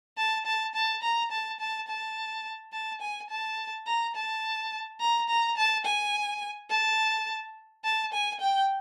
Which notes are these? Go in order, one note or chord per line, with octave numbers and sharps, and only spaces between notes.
A5
A5
A5
A#5
A5
A5
A5
A5
G#5
A5
A#5
A5
A#5
A#5
A5
G#5
A5
A5
G#5
G5